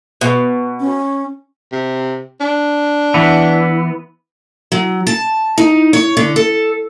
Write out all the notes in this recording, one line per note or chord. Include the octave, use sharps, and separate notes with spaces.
B2
C#4
C3
D4
E3 B3
F#3
A5
D#4
C#5
D3
A4